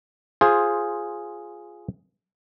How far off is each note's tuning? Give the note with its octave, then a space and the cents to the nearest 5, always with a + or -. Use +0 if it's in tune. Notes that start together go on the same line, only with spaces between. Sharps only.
F4 +0 G#4 +0 C5 +10